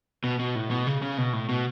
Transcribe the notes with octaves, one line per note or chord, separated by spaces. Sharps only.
B2
B2
A2
B2
C#3
C#3
B2
A2
B2